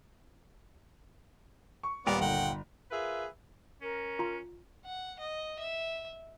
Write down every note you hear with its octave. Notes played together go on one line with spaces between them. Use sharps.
C#6
D#2 A#2 G3 B3 A#4 D5 G5
G1 F#5 G5
F4 G#4 A#4 B4 E5
C#4 A#4
F4 A#5
F#5
D#5
E5